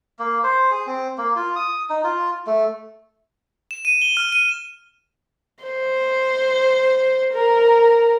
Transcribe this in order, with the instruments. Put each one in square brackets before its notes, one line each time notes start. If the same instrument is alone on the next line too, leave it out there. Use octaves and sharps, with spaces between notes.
[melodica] A#3
C5
G#4
C4
A#3
F4
D#6
D#4
F4
A3
[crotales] E7
D#7
G7
F6
D#7
[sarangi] C5
A#4